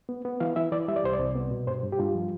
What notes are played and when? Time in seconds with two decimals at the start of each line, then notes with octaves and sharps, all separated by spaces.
0.09 B3
0.25 B3
0.40 E3 F5
0.56 E3 E5
0.72 E3 D5
0.88 G3 E5
0.96 D5
1.04 C2 C5
1.13 D5
1.20 C2
1.35 B3
1.51 B2
1.67 G2 C5
1.83 G2
1.92 G4
1.99 G2 F4
2.15 F3